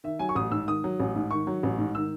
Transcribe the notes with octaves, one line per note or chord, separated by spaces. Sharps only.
D#3 E5
F#3 G#5
C#6
A1 D#6
G#2 E6
D#3 D#6
F#3
A1
G#2
D#3 C#6
F#3
A1
G#2
D#3 E6